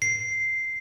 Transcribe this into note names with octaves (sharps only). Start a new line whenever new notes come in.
C7